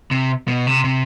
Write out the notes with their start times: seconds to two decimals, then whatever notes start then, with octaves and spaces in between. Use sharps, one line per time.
0.11 C3
0.48 B2
0.67 C3
0.84 C3